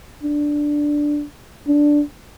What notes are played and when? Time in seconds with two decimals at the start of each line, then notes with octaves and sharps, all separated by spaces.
0.23 D4
1.68 D4